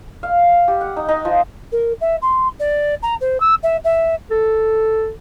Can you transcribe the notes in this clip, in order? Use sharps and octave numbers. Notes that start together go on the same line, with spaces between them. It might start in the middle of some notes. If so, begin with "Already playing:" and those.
F5
G4
F#5
D#4
D#4
F3
A#4
E5
C6
D5
A#5
C5
E6
E5
E5
A4